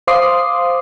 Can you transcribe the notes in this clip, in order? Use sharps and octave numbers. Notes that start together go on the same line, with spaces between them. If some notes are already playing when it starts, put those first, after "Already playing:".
C5 F5 C6 D6 D#6 C7